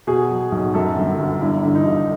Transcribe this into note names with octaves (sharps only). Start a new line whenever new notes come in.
B2 G#4
F#3
B1
F#2 A4
G1
G1
G2 E4
D3
D#4
G1